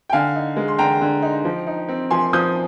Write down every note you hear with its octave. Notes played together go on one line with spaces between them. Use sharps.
G5
D3 F5 G#5
D#4
G#3
C6
D3 G5 A#5
D3
D#4
F3
D#4
C4
F3 G#5 C6
F3 D#6 G6